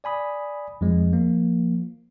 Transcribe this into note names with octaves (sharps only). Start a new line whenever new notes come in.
D5 G#5 B5 D#6
F2 F3 G#3
F3 A#3